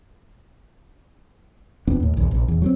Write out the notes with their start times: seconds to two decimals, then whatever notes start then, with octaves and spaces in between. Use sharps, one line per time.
1.87 E1 F2 B3 D4
2.00 D#2 A2
2.17 B1 E2
2.31 A#1
2.48 D#1 E2
2.62 F#3 A3 C4